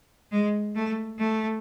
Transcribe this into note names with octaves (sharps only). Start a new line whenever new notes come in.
G#3
A3
A3